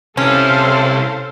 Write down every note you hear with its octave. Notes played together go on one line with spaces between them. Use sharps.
C3 C#4 E4 A4 C5 F5